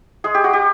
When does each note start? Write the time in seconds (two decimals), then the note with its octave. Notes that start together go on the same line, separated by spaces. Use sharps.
0.24 G#3 G#4
0.34 G4
0.44 F#4
0.53 G4